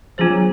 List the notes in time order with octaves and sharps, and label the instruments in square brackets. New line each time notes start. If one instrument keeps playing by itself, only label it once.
[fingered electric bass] F3 [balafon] B3 D4 F4 G#4 C5
[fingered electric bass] F#3